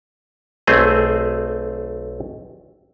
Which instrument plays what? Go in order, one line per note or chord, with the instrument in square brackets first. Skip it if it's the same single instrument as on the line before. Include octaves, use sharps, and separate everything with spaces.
[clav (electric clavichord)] B1 A3 C4 G#4